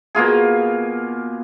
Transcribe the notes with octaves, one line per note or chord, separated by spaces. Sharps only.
B2 A#3 F4 G#4